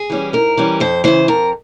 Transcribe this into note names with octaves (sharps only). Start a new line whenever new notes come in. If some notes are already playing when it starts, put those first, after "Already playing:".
Already playing: G#4
E3 G3 C#4
G#2 A#4
E3 G3 C#4
F2 C5
C#3 E3 C5
F2 A#4